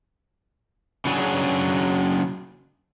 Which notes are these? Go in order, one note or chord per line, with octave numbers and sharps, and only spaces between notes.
C#3 F#3 D4 G#4